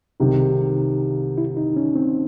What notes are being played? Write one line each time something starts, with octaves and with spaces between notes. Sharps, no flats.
C2 C3 D#3 D#4
E4
D#4
C#4
C4